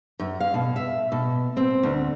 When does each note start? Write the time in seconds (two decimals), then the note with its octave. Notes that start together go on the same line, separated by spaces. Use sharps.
0.20 F#2
0.40 F5
0.54 B2
0.76 E5
1.12 B2
1.57 C4
1.83 D2